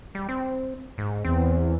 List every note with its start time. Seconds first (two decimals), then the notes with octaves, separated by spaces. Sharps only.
0.15 G3
0.29 C4
0.98 G#2
1.25 E2 C4